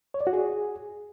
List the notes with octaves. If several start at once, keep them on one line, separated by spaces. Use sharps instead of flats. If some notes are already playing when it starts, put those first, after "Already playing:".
C#5
D5
F#4
G#4